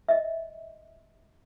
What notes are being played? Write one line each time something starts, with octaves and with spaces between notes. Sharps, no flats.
D#5 E5